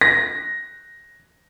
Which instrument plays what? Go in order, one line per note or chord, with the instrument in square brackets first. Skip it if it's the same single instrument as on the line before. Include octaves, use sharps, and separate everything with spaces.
[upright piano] A#6